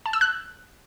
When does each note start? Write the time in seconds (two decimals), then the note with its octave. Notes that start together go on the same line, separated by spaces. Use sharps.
0.06 A5
0.13 E6
0.21 F#6